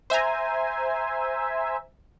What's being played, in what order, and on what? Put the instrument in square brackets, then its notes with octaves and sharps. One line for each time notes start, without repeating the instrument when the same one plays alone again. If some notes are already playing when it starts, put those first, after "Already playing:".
[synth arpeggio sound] C5 E5 G#5 A#5